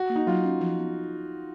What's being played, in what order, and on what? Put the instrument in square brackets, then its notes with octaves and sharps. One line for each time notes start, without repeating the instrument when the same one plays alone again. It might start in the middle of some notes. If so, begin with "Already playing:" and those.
Already playing: [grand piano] F#4
[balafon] A#3
[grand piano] D#4
[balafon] F#3 [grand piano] F4
[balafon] C#4
F3
B3